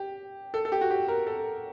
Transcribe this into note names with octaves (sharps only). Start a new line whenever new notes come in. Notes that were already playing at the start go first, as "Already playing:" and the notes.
Already playing: G4
A4
A4
G4
F#4
G4
A#4
A4